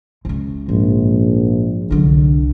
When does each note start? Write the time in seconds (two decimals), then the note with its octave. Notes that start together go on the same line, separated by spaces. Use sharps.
0.25 C#2 C#3
0.69 A#1 G#2
1.91 C2 D3 F#3